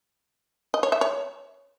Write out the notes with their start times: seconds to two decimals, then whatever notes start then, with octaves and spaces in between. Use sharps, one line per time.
0.74 D#5
0.83 C#5
0.92 E5
1.01 C#5